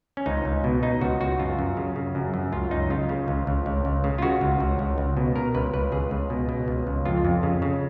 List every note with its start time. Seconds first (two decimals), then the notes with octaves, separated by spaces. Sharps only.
0.17 C#4
0.26 C#2 D#4
0.45 C#2
0.64 B2
0.83 B2 D#4
1.01 C#2 F#4
1.20 C#2 F#4
1.39 F#2 F4
1.59 F#2
1.77 C#3
1.96 C#3
2.15 F#2
2.34 F#2
2.53 C#2 F4
2.71 C#2 D#4
2.90 C#3 F4
3.09 C#3
3.28 C#2
3.47 C#2
3.66 C#2
3.85 C#2
4.04 C#3
4.18 F4
4.22 C#3 F#4
4.41 C#2
4.60 C#2
4.79 C#2
4.98 C#2
5.17 B2
5.36 B2 A#4
5.55 C#2 B4
5.74 C#2 B4
5.92 C#2 G#4
6.11 C#2
6.30 B2
6.49 B2
6.68 C#2
6.87 C#2
7.06 F2 F4
7.25 F2
7.43 C#3
7.62 C#3